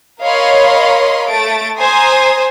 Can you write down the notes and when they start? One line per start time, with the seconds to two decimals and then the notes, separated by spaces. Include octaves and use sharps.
0.22 A#4 C#5 D#5 F5 B5 C6
1.29 A3 A6 D7
1.77 C5 G#5 A#5 C6 D#6